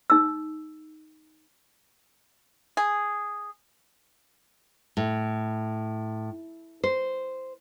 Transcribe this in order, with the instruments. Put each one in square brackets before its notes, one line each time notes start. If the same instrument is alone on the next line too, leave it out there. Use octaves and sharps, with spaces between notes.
[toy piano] D#4 E6
[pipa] G#4
[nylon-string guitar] A2
C5